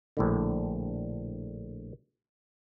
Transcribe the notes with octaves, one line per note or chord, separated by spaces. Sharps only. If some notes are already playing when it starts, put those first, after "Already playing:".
A#1 A2 D3